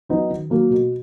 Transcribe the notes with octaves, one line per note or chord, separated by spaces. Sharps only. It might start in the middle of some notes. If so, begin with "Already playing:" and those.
F#3 B3 D#4 F#4
D#3
F#3 A#3
B2